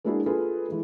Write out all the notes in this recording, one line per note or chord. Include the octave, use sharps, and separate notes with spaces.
G#3 A#3 D4 E4 F#4 G#4
F4 G#4 A4 B4
E3 G#3